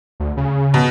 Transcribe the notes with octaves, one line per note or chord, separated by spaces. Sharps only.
D2
C#3
B2